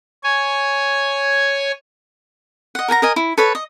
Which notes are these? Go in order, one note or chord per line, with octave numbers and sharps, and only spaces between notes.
C#5 G#5
D#5 F#5
A#4 F#5 G#5 A#5
A#4 D#5 G#5
E4
A4 B4 C#5
D#5